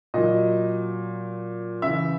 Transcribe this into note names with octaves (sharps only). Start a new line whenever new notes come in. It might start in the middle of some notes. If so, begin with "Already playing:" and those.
A#2 F#3 D#5
C#3 E3 E5